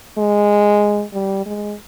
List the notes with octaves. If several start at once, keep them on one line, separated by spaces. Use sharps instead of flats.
G#3
G3
G#3